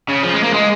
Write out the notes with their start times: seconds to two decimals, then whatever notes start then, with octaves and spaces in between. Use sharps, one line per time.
0.08 C#3
0.23 F3
0.34 G#3
0.43 A#3
0.54 G#3